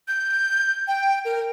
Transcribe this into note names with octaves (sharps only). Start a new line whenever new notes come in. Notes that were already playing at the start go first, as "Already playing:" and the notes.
G6
G5
A#4